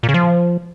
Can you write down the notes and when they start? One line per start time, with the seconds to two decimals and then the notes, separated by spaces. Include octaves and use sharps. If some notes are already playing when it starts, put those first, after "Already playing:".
0.03 A#2
0.09 C#3
0.14 F3